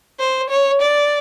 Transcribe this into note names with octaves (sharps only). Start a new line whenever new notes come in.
C5
C#5
D5